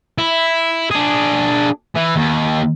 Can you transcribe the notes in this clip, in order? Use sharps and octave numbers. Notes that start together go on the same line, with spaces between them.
E4
D4 G#4
E3
D#2